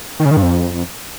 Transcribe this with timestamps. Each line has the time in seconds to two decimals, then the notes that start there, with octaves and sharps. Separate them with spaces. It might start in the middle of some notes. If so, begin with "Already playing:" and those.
0.20 D#3
0.25 C#3
0.31 D#3
0.37 G2
0.42 F2